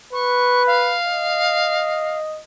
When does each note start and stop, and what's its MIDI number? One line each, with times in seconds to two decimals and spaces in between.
0.13 0.97 71
0.13 0.66 85
0.67 2.19 77
1.07 2.40 75